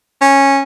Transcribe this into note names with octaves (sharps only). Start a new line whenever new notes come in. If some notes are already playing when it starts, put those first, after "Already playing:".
C#4